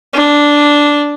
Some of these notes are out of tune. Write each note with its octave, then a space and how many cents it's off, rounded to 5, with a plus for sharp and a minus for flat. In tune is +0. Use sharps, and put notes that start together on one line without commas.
D4 -5